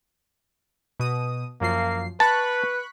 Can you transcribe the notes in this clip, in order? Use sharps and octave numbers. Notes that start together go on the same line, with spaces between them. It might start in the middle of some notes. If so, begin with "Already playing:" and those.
B2 D#6
F#2 F3 A#3 C7
B4 A5 B5 C#6 F#6